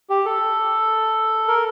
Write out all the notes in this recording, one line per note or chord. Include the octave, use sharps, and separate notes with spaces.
G4
A4
A#4